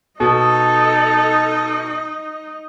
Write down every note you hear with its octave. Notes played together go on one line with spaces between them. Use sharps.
B2 D#4 A4 D#5